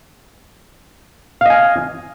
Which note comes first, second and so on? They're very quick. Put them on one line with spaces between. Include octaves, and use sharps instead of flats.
F5 D#5 G#5